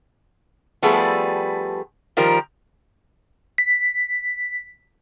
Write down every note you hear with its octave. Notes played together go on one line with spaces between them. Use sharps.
F3 G3 A3 B3 G#4
D#3 F3 G3 A#4
B6